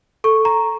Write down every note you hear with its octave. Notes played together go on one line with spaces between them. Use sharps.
A4 C#6
A#5